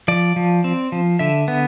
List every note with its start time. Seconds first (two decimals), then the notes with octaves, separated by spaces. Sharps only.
0.08 F3 D5
0.36 F3
0.64 C4
0.92 F3
1.19 D3 E5
1.48 B3